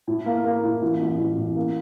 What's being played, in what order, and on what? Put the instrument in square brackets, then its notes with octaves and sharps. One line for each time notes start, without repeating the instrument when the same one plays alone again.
[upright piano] A2
A#3
A#3
A2
A1
A1
A1
A1
A#3